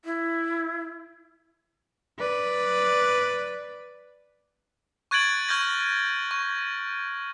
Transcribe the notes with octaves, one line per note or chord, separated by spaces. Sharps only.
E4
B4 D5
C#6 F#6 G#6 A6 D7 F#7
C#6 F6 G6 G#6 A#6
C#6